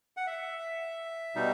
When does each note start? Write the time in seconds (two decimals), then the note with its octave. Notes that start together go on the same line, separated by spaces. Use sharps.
0.17 F#5
0.27 E5
1.35 B2 G3 D#4